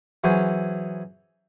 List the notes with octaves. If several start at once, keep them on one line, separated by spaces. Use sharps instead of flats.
E3 F#3 C#4 G#4 C5